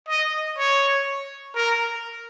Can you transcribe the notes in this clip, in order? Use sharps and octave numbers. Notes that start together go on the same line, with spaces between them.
D#5
C#5
A#4